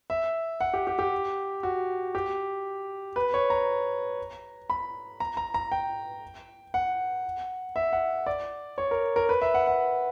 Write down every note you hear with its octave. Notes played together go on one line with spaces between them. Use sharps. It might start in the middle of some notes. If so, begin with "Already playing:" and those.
E5
F#5
G4
G4
G4
F#4
G4
B4
C#5
A#5
B5
A#5
A#5
A#5
G5
F#5
E5
F#5
D5
C#5
A#4
A#4
B4
E5
F#5
F#5